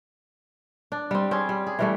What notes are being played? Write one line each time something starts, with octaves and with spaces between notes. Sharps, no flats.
D4
G3 C4
C4 C#4 G#4
G3
G#4
E3 G3 A3